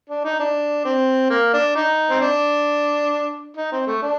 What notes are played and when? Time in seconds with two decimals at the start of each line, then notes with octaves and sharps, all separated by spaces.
0.10 D4
0.24 D#4
0.40 D4
0.85 C4
1.30 A#3
1.53 D4
1.75 D#4
2.10 C4
2.21 D4
3.57 D#4
3.72 C4
3.87 A3
4.02 D4